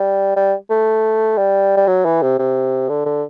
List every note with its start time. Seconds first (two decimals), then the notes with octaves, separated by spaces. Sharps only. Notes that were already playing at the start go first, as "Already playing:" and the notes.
Already playing: G3
0.36 G3
0.70 A3
1.38 G3
1.77 G3
1.87 F#3
2.05 E3
2.22 C3
2.39 C3
2.89 D3
3.06 D3